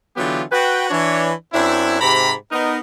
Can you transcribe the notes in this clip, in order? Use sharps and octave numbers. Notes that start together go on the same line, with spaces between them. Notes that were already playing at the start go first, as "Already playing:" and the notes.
D3 E3 F#3 B3 F4 G4
F#4 B4 G5
E3 D4 C#5
F#2 C4 D4 E4
G#2 C3 G4 A#5 B5
B3 D#4 A#4